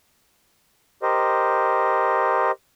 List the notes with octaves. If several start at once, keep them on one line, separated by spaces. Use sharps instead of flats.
G4 A#4 C5 D#5